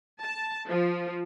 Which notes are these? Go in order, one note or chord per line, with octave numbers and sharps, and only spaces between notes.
A5
F3